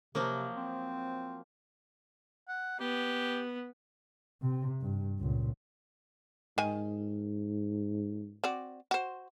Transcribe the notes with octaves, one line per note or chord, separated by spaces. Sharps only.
C3 F3 F#3 A#3
C4
F#5
B3 G4
C3
G2
C#2 A#2
G#2 D#3 G#5
C4 F#4 D5
F#4 C5